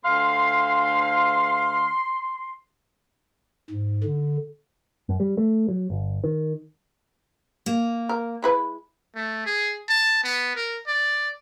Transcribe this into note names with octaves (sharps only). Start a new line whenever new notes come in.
D2 F5 C6
G#2
D3
F#2
G3
A3
F#3
G1
D#3
A#3
A#4
G#3 E4 B4
A3
G#4
A5
B3
A#4
D5